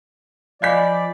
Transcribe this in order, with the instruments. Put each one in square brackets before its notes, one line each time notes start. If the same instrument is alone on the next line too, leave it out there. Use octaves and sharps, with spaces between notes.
[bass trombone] F3 [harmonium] D5 [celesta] D#5 G#5 B5 [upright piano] F5 G6 B6